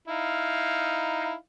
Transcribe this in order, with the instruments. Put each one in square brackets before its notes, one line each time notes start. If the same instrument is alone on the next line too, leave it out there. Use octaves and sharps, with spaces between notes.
[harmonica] D#4 E4 F5